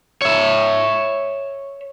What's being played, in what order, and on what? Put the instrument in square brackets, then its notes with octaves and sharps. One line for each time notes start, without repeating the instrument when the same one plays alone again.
[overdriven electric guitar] C#5 E5